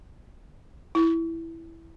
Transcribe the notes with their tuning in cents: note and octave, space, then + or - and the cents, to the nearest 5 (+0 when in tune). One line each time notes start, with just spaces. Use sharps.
E4 +0